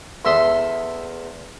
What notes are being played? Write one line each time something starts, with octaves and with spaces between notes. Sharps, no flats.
E2 A4 E5 C6 D#6